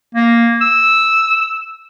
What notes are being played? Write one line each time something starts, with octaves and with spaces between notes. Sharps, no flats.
A#3
E6